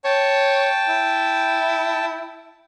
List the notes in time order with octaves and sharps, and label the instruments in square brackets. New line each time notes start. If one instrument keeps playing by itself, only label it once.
[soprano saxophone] C#5 [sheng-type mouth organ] G5 A5
[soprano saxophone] E4